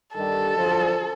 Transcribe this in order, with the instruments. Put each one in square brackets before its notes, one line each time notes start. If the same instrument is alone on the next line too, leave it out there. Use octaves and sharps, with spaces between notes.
[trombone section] G2 D#3 G3 [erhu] A4
[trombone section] F#2 D3 F3